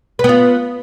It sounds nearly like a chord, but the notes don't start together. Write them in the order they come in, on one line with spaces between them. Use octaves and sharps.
B4 B3 F4